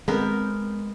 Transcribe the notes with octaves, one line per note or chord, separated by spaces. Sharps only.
G#3 B3 C4 A#4